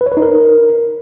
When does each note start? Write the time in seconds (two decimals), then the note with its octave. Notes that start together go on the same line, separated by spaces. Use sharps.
0.01 B4
0.06 C#5
0.12 B4
0.17 D#4
0.22 A#4